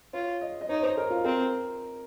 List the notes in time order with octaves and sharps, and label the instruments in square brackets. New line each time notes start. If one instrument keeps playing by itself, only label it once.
[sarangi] F4 [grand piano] C#5
[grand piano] D#5
D#5
[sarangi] D#4 [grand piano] C#5
[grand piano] C5
A#4
F4
[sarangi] C4 [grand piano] A#4